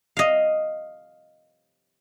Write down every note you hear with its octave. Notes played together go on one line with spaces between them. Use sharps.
D#5 F5